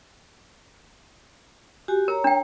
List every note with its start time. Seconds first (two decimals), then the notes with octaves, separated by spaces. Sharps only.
1.88 F#4 G4 G#5
2.08 A#4 C#5 A#5
2.24 D4 G5